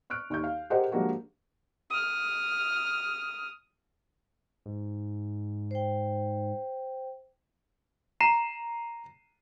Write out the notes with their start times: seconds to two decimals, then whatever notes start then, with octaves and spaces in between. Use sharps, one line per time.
0.10 C#6 F6 F#6 D7
0.30 D#2 C#6 G6
0.44 F5
0.70 G4 G#4 A#4 C5 D#5 F#5
0.91 F3 G#3 A#3 D4 F#4 G4
1.90 D#6 F6
4.66 G#2
5.71 C5 G5
8.21 A#5 C7 D#7 E7